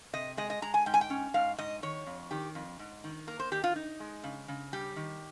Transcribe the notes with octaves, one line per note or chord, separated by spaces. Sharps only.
C3 D#5
G#3 D#5
D#5
G#3 A#5
G#5
G#2 G5
G#5
G5
C#4
G#2 F5
G#2 D#5
D#3 C#5
F2
D#3 G4
F2
G#2
D#3
A#3 A#4
C5
D#3 G4
F4
D#4
G#3
C#3
C#3
G3 G4
D#3